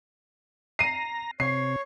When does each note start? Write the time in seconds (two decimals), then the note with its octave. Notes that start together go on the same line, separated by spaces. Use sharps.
0.79 A#5 C7 D#7
1.40 C3 C#5 C7